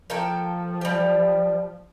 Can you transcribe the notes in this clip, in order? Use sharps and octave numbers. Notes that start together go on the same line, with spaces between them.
F3 A#3 A4 G5
G3 G4